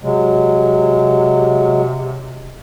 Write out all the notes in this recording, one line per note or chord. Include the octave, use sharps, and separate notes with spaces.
C3 F#3 G#3